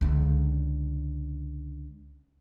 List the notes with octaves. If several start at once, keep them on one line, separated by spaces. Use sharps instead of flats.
C#2 D3